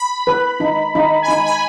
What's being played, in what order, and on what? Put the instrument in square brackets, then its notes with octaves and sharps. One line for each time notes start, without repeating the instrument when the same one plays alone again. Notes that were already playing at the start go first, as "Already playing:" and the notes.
Already playing: [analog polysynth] B5
[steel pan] B4
D#4
D#4
[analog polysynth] G#5
[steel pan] D#4 [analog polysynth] B5
[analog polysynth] G#5